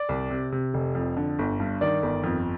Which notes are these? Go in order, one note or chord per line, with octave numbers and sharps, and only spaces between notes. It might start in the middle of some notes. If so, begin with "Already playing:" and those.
Already playing: D5
C2
C3
C3
F1
F2
D3
G1
G2
D#3 D5
G1
F2